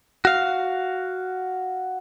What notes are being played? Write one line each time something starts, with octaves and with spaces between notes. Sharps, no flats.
F#4 F5